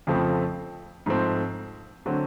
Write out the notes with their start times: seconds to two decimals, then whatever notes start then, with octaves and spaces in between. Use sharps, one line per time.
0.07 F2 C#3 F3 A3 C4
1.06 G#2 F3 A3 C4
2.06 D3 F#3 A3 C4